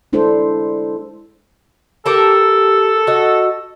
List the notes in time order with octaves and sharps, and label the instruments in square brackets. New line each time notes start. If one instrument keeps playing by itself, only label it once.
[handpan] G#3 D4 E4 A4 C5
[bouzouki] G4 A#4 A5 [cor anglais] A4
[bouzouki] F#4 D#5